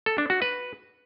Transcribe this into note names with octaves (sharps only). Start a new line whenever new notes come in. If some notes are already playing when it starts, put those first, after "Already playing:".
A4
D4
F#4
B4